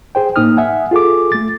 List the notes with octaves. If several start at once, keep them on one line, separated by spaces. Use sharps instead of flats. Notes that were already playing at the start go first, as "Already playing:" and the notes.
G#4 C5 G5
A2 A#3 D#4 D#6 F6
E5 F#5 G#5
F4 G#4 A4 D6
A3 A6